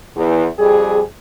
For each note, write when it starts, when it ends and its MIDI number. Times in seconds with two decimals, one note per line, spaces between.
0.16 0.46 40
0.58 1.01 41
0.58 1.01 55
0.58 1.01 68